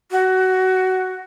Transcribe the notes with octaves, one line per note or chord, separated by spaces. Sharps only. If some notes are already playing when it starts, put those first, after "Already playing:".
F#4